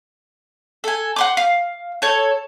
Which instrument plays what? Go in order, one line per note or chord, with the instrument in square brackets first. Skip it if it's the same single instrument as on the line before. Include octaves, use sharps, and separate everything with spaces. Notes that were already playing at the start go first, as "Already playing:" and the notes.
[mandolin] A4 G#5
F#5 C6 D6
F5
A4 C#5